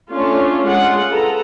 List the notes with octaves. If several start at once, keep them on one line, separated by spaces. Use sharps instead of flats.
A3 C#4 D4 F4 C#5
G#3 F4 F#5
A4 B4 A#5